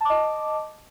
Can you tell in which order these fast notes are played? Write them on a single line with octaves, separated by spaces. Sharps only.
A5 D6 D#5